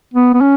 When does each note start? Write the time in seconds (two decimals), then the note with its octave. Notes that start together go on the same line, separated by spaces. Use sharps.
0.14 B3
0.34 B3
0.41 C#4